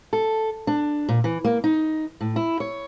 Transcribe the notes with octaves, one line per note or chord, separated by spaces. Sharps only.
A4
D4
A#2
E3
A#3
D#4
A2
E4
C#5